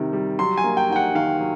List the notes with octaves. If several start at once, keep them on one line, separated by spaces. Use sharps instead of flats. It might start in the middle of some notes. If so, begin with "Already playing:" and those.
Already playing: C3 D#3 G3
G3
F#3 C6
G#5
A#3
G5
D#4 G5
F#5
D#3 F5
F#3